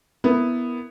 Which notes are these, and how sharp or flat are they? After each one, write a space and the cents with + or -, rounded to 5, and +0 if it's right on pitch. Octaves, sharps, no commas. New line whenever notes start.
B3 +0 E4 +0 A#4 +0